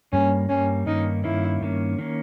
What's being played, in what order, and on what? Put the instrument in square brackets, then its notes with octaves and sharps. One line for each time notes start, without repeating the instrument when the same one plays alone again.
[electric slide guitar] G2 G3 A#3 [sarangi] C#4
[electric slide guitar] G2 G3 A#3 [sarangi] C#4
[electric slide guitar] G2 D#3 A#3 C#4 [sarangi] D#4
[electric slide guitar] G2 D#3 A#3 C#4 [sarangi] E4
[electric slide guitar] G2 D#3 A#3 C#4
D#3 A#3 C#4